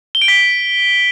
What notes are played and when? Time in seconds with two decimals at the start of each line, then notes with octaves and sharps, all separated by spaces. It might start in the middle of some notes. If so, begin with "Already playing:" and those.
0.15 G7
0.22 D7
0.28 B6